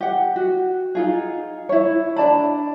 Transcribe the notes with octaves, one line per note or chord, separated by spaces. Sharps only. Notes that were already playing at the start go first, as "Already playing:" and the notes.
G4 F#5
F#4
D#4 F4 G#4
E4 C#5
D4 D5 A5 B5